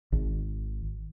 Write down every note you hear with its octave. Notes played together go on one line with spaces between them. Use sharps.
G#1